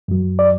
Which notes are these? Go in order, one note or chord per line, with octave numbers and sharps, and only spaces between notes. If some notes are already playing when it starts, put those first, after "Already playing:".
F#2 F#3
D5